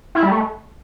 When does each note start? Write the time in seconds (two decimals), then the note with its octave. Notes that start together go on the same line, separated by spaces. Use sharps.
0.15 E4
0.23 G3
0.31 A3